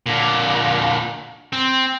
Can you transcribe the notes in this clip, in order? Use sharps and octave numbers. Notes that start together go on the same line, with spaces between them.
A#2 D3
C4